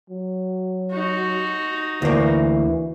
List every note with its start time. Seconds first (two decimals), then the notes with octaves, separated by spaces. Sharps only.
0.10 F#3
0.91 D#4 F#4
2.02 D2 E3 A#3